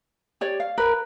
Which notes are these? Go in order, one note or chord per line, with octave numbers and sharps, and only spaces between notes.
G4 C#5 D5
F5
A#4 B4 B5